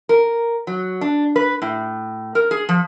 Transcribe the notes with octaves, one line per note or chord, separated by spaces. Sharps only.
A#4
F#3
D4
B4
A2
A#4
G#4
F3